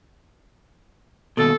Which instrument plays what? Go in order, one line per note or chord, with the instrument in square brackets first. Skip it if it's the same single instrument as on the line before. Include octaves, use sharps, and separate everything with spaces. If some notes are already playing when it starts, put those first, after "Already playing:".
[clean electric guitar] D#2 B2 [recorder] A4